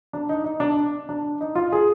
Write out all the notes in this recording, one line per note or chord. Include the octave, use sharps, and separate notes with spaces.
D4
D#4
D#4
D4
D4
D#4
F4
G#4